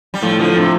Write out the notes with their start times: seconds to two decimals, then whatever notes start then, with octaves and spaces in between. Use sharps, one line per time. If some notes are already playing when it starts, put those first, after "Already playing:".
0.14 G3
0.23 A2 F3
0.40 D3 F3
0.56 A2 C3